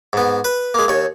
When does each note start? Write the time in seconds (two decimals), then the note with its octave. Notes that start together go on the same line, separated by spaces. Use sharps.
0.13 G#2 B3
0.44 B4
0.74 G#3 A#3
0.88 D#2 C#5